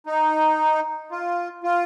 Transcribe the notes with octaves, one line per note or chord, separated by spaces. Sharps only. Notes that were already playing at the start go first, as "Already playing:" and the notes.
D#4
F4
F4